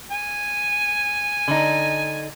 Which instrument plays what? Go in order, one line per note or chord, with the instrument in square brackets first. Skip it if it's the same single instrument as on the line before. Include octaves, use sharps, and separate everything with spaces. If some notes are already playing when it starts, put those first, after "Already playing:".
[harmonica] G#5
[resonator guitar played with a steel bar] D3 D#4